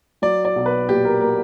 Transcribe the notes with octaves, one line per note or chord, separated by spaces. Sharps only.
F#3 D5
D5
B1
B4
A#2 G4
A#4
A#3 A#4